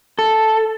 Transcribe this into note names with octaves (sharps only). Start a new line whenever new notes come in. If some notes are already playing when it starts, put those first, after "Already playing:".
A4